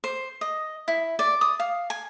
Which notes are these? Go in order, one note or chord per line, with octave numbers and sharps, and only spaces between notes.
C5
D#5
E4
D5
D#6
F5
G#5